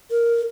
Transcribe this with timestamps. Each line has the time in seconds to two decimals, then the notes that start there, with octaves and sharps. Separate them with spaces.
0.11 A#4